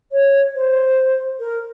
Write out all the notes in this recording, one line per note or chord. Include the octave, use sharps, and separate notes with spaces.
C#5
C5
A#4